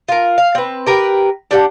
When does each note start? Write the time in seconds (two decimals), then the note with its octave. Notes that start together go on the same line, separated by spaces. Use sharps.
0.08 F4 A#4
0.38 F5
0.55 C4 B4
0.87 G4 A#4 B4 G5
1.51 D4 G4 F#5